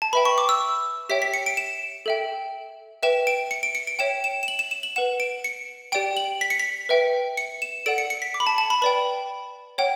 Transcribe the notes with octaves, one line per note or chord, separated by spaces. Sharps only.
A5
B4 E5 G5 B5
C#6
D6
E6
G4 C#5 E5 G5 B6
B6
C#7
D7
E7
A4 E5 G5
B4 E5 G5 E7
D7
C#7
D7
C#7
D7
C#5 E5 G5 E7
E7
E7
F#7
E7
E7
F#7
B4 F#5 E7
D7
C#7
G4 D5 G5 D7
F#7
B6
C#7
B6
B4 E5 G5
C#7
E7
A4 D5 F#5 D7
C#7
C#7
B6
D6
B5
A5
A5
B5
B4 D5 G5 B5
C#5 F#5 G5